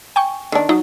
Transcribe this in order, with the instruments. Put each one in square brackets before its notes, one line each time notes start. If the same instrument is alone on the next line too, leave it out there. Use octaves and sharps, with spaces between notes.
[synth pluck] G5 G#5 C#6
[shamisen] D#3 D4
[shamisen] F#3 [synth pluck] D#4